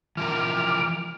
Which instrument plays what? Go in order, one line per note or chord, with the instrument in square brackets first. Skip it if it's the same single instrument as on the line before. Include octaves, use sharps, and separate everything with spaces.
[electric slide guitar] E3 F3 A#4 [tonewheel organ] D6 F6